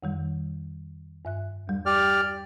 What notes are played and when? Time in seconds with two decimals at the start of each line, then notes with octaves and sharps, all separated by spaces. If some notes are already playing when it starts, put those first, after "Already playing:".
0.03 F2 D#3 G3
1.25 G2 E5 F#6
1.67 E2 G3
1.86 G4 D5 F6